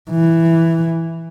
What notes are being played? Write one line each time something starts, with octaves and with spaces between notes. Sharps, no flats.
E3